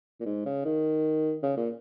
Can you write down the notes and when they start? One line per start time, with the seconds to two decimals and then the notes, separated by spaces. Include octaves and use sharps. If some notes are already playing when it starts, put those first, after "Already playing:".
0.20 A#2
0.25 G#2
0.46 C#3
0.65 D#3
1.43 C#3
1.57 A#2